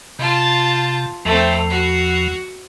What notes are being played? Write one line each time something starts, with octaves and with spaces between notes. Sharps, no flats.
C3 F4 A5
E2 F3 A3 C4
F#4